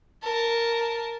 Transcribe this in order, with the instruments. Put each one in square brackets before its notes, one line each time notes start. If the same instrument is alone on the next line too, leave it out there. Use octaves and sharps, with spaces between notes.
[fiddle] A#4 A5